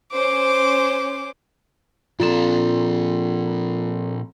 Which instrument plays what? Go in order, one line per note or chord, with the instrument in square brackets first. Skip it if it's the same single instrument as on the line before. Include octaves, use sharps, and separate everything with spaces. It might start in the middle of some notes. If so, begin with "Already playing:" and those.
[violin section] C#4 C5 [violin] D6
[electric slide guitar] A#2 F3 A#3 [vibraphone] C4 A4 D5 [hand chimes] F4